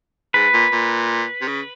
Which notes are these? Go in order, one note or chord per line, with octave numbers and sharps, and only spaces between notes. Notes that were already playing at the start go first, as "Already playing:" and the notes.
G#2 B4
A#2
A#2
C3
C#3